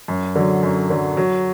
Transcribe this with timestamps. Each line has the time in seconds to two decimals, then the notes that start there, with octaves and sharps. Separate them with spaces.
0.08 F#2
0.35 D3 F#3
0.63 F#2
0.90 D3 F#3
1.17 F#3